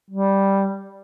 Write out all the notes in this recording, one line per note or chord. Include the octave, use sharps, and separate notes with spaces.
G3